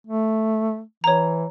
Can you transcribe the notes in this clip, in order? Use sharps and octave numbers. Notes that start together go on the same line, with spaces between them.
A3
E3 C#5 A#5